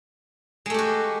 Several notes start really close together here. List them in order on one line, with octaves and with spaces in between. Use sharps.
G#3 A3 G4 F#4